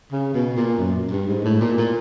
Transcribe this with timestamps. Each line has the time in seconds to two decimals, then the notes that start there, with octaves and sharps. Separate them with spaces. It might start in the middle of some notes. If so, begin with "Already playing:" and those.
0.13 C#3
0.34 B2
0.57 A#2
0.79 F#2
1.11 G2
1.28 G#2
1.45 A2
1.61 A#2
1.78 A#2